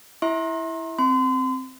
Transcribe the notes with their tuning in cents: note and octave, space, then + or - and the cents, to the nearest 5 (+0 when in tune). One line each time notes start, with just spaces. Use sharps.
E4 +0 E5 -25 C6 +35
C4 +0 C6 -35